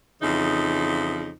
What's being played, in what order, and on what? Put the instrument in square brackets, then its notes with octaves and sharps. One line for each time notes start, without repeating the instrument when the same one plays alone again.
[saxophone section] F2 C#3 E3 D#4